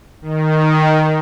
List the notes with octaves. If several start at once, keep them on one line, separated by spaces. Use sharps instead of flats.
D#3